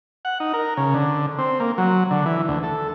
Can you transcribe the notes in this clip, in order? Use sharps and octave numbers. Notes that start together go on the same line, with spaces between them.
F#5
D#4
A#4
C#3
D3
C4
A#3
F#3
D3
E3
D2
A4